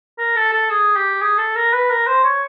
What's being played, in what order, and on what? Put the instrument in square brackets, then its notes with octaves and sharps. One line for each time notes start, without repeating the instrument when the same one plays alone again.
[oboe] A#4
A4
A4
G#4
G4
G#4
A4
A#4
B4
A#4
C5
C#5